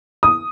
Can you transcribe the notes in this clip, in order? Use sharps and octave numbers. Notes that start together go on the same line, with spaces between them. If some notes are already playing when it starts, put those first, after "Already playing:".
D#6